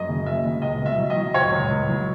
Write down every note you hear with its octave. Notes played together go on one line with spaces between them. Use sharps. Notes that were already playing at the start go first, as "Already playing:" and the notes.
Already playing: F#2 D#5
C#3
F#1 E5
C#3
C#2 D#5
B2
E5
F#3
D#5
F#3
C#2 C#5
C#2
C#2
F#3